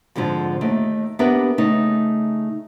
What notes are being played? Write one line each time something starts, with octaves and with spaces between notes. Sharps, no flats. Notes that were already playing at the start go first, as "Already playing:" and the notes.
F2 G#2 D3 F3
D#2 D#3 A3
B3 D4 G4 A#4 B4 E5
C#3 A3 D#4